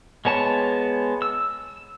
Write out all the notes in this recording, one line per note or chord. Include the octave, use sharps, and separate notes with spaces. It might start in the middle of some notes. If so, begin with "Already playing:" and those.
G#3 B3 C#5 A5
E6